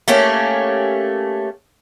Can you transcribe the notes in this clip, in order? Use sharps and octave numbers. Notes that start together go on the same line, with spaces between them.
A3 A#3 C#4 G4